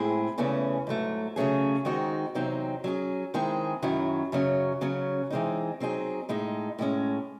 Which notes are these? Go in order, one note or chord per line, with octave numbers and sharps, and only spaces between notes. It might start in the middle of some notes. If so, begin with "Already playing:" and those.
Already playing: A2 G#3 C4 E4 G#4
E2 C#3 E3 A3 C#4
G#2 F#3 A3
C#3 F#3 A3 C#4 G#4
D#3 G#3 C4 D#4 F#4
E2 C3 F#3 C4 D#4
F#3 C#4 G#4
D#3 G#3 C4 E4 G#4
F#2 D#3 F#3 C#4 E4
F#2 C#3 F#3 C#4
C#3 F#3 C#4
E3 G#3 C4 D#4
F#3 C4 D#4 G#4
A2 G#3 D#4
A2 G#3 C#4